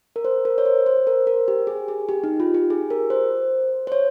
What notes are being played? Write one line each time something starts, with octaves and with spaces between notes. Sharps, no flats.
A#4
C5
A#4
C#5
C5
C5
A#4
A#4
G4
G#4
G#4
G4
D#4
F4
G4
G#4
A#4
C5
C5
C#5